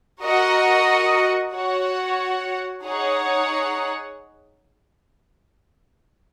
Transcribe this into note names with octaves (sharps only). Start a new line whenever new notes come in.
F#4 A#4 D#5 F#5
F#4 C#5 F#5
D#4 G#4 C#5 F#5